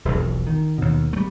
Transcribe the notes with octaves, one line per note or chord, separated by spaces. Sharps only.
E1 B1 F2
D#3
D#2 B2
G3 A3